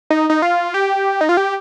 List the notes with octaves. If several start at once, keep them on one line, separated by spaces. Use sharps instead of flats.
D#4
D#4
F4
G4
D#4
F4
G4